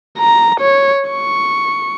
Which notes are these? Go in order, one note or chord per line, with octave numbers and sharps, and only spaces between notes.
A#5
C#5
C#6